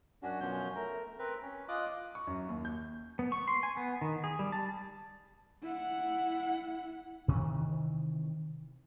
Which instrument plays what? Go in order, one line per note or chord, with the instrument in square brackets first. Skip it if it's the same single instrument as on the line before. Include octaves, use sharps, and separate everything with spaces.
[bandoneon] F#2 C#4 D4 F#4
F#2 B2 F3 C#4 G6
A3 A#4
C4 A#4 B4
C#4
F4 D#5 D6 F#6
[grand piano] C#6
F#2
D#2
G6
[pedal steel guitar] B3
C#6
C6
G#5
B3
D#3
G#4
G3
A5
[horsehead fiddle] E4 F#5
[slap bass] C3 D#3 E3